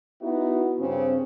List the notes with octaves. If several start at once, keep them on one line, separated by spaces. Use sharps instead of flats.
B3 D#4 E4 F#4
G2 C#3 C4